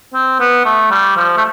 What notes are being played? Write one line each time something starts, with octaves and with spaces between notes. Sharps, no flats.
C4
B3
A3
G3
F3
A3